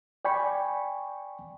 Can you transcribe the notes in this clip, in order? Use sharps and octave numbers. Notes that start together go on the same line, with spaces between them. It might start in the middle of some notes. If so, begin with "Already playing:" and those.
D5 G5 G#5 B5 C#6